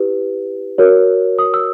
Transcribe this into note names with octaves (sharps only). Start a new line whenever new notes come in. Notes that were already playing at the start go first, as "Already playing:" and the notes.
Already playing: E4 G4 B4
F#4 A#4 C#5
D#6
E6